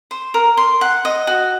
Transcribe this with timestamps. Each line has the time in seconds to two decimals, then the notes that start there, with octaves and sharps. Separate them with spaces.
0.11 C5
0.34 A#4
0.57 C6
0.81 F#5
1.05 D#5
1.27 F#4